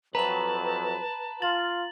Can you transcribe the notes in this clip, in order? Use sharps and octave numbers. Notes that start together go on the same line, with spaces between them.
F2 F#3 B4 A5 A#5 F#7
F4 A6 F#7